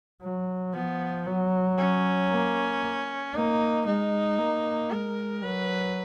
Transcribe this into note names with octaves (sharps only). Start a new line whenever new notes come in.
F#3
F3 B3
F#3
C#4
A#3
A#3 D#4
G#3 D#4
A#3
G#3 A#4
F#3 B4